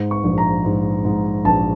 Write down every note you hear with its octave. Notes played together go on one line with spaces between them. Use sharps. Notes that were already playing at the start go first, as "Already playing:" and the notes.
Already playing: G#2
C#6
A#1
A#5
G#2
G#2
A#1 A5